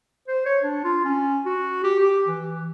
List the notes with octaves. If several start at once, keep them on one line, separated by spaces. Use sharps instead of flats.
C5
C#5
D4
F4
C#4
F#4
G4
G4
E3